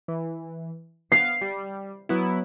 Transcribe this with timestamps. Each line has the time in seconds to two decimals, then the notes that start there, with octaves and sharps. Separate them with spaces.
0.08 E3
1.12 B3 F5 C7
1.41 G3
2.09 F#3 B3 E4